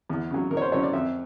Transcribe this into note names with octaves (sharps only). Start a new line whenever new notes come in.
E2
C#3 F#3
E2 A#4
C#5
C5
C#3 F#3 C#5
D5
F2 E5